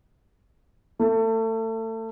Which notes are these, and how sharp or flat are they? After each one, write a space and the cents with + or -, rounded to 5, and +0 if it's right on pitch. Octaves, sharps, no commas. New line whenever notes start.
A3 +30